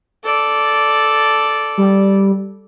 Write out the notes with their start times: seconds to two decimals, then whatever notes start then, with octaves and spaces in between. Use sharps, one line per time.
0.24 A4 D5
1.78 G3